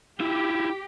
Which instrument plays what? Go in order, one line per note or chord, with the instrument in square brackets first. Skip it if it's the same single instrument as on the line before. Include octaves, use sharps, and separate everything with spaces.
[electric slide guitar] E4 F4 [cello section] G4